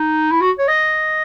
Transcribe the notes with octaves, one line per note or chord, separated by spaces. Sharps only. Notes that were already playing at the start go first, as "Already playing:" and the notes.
Already playing: D#4
E4
F#4
C#5
D#5